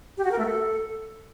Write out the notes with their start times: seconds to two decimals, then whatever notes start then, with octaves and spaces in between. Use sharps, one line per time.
0.17 G4
0.24 F#4
0.31 A#4
0.38 A3
0.45 A4